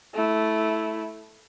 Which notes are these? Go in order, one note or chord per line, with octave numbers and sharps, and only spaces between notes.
A3 E4